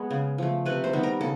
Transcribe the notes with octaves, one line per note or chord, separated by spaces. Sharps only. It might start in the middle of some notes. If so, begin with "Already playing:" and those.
Already playing: G#3 B3
C#3
F3 A3
C3 B4
C5
D#3 G3 B3
A#4
C#3 A4